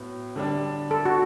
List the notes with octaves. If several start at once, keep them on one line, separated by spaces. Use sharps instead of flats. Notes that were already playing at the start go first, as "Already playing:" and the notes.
Already playing: A2 F#3 B3
D3 G3 D4
A4
F#4